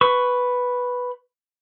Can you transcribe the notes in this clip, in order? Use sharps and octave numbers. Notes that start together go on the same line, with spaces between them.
B4 C#6